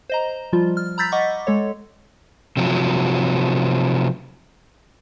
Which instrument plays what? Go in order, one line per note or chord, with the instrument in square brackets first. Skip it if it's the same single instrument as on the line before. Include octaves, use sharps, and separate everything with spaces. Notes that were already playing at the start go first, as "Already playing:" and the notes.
[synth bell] C5 D#5 A#5
F3 G3 F4
F6
A#5 B5 E6 G6 A6 B6
D#5 F#5 C#6 D6
G#3 A4 C#5
[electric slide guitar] C3 F3 F#3